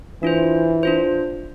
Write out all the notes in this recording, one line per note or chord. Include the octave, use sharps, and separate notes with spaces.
E3 D4 F4 C5
D4 F4 C5